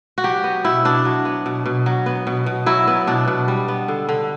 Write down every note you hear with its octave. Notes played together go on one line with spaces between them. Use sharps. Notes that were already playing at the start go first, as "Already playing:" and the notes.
F#4
F#3 G4
B3
B2 E4
B2 D4
F#3
B3
B2
B2
F#3
B3
B2
B2
F#3 E4
B3
B2 D4
B2
G3
B3
D3
D3